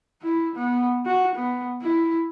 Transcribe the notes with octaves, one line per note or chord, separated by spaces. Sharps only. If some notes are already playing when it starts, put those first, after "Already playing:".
E4
B3
F#4
B3
E4